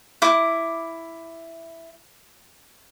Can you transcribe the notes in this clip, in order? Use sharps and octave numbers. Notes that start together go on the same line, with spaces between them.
E4 D6